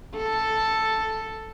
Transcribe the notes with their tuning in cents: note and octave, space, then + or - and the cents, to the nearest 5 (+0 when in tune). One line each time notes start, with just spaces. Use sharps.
A4 +0